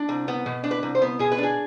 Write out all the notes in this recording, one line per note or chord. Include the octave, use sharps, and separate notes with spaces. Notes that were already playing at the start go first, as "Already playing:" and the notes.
Already playing: D4
C2
B3
B2
D4
B4
C2
C5
B3
B2 G#4
B4
D4 G#4